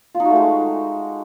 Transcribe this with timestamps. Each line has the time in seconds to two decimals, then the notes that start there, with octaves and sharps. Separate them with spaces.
0.15 F4
0.20 D#4
0.25 F#4
0.30 A3
0.36 G#3